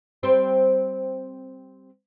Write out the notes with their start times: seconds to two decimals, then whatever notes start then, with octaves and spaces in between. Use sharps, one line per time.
0.23 G3 C4 C5